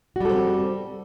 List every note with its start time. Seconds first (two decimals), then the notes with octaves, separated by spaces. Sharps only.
0.16 F#4
0.20 G3
0.25 A4
0.30 C4